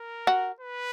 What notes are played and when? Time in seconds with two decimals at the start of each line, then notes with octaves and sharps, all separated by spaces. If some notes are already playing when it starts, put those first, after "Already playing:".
Already playing: A#4
0.27 F#4
0.60 B4